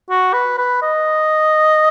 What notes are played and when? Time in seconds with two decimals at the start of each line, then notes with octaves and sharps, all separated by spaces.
0.10 F#4
0.34 B4
0.58 B4
0.82 D#5